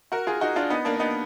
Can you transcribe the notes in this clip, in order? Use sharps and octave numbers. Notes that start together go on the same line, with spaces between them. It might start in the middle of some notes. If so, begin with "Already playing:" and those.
F#4 A#4
F4 G#4
D#4 F#4
D4 F4
B3 D#4
A#3 D4
D4
B3 D#4